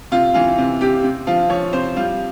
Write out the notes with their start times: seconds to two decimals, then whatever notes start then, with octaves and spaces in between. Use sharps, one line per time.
0.12 C3 F4
0.34 E3 F4
0.58 C3
0.81 C3 G4
1.04 C3
1.27 F3 F4
1.50 F3 C#5
1.73 C3 C5
1.96 G3 F4